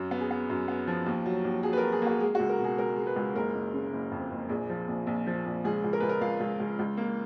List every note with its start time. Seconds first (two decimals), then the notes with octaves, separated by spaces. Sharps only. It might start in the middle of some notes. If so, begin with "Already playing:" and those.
Already playing: F#2
0.11 B3
0.20 G#4
0.31 B3
0.50 F#2
0.68 B3
0.87 F3
1.06 D#2
1.26 F#3
1.44 D#2
1.63 F#3 G#4
1.73 B4
1.77 A#4
1.82 F#3
1.92 G#4
2.02 A#3 F#4
2.20 G#3 G#4
2.35 F#4
2.39 C#2
2.49 A#4
2.59 B2
2.64 G#4
2.78 G#3 A#4
2.97 G#3
3.07 B4
3.16 C#2
3.35 F#1 A#4
3.55 F#1
3.74 C#3
3.93 F#1
4.11 F2
4.31 F#1
4.49 A#1 G#4
4.70 F3
4.88 A#1
5.07 A#1
5.27 F3
5.46 A#1
5.64 C#2 G#4
5.84 C#2
5.93 A#4
6.00 C#2 B4
6.09 A#4
6.21 C#2 F5
6.40 C#2
6.60 C#2
6.79 C#2
6.97 A#3